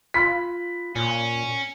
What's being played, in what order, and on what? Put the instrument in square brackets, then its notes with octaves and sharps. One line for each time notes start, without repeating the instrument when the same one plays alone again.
[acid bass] F4 [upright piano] B5 B6
[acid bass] A#2 [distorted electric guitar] C#4